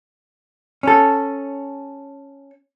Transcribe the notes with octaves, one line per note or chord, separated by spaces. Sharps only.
C#4 A4